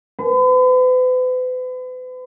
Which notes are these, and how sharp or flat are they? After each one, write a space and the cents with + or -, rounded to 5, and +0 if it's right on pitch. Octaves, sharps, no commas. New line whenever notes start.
B4 +40